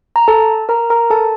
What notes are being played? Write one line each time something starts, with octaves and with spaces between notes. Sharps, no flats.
A#5
A4 A5
A#4 A#5
A#4 A#5
A4 A5